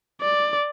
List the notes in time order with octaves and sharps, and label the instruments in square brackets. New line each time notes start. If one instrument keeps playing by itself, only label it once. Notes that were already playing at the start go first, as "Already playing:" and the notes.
[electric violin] D5